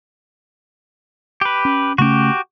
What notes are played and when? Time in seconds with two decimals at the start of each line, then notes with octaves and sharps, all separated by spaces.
1.41 G4 B4
1.65 C#4
1.98 C#3 A3 C#4 F#4 G4